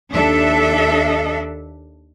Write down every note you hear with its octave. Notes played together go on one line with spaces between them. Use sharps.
D#2 D4 A4 E5